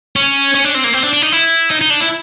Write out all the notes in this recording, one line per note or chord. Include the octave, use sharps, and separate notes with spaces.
C#4
C#4
D4
C4
A#3
C4
D4
D4
D#4
E4
D#4
D#4
D4
E4